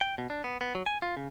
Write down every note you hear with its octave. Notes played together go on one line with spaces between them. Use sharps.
G5
B2
D4
B3
B3
F#3
G#5
F4
C#3